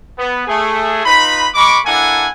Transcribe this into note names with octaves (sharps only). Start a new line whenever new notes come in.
B3
A3 G#4
D#4 F4 B4 B5
G#3 B5 C#6 D6
A#3 D4 E4 A4 F#5 G#5